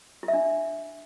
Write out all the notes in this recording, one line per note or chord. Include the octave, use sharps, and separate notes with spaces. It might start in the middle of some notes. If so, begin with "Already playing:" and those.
E4
E5
D4